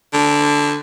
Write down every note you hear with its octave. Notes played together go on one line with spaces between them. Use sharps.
D3